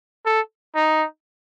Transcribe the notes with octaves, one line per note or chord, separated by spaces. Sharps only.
A4
D#4